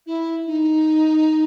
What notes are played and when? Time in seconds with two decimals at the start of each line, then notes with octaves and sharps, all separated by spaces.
0.06 E4
0.46 D#4